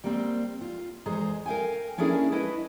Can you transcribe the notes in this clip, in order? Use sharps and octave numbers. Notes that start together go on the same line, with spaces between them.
G3 A#3 C4
F4
E2 G#3 G#4 C5 A#5
A#4 F5 G5 G#5
A#3 C#4 D4 E4 G#4 A#4
E4 B4 C#5 D#5